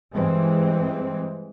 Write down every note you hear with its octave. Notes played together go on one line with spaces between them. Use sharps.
G2 E3 G#3 C4